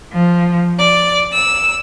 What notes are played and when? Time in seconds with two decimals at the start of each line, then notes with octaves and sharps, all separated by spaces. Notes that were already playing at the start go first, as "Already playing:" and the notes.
0.13 F3
0.80 D5
1.32 E6